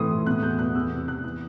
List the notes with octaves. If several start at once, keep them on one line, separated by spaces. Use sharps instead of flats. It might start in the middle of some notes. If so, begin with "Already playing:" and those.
Already playing: A2 E3 C6 D#6
A2
B2 F#6
E2 G6
B2 F#6
E2 E6
C3
E2 F#6
E3 F#6